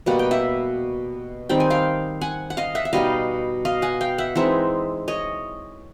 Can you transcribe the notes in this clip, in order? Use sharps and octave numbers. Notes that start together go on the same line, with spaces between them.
B2 G3 A#3 F#5
G5
E5 F#5
D#3 G3 C4 D#4 G5
G#5
F5 G5
F#5 G#5
F#5
D#5 F5
E5 F#5
E5
B2 G3 B3 D#4 D#5 F5
D#5 F5
F#5 G#5
F5 G5
E5 F#5
E3 G#3 C4 D#4 E5 F#5
C#5 D#5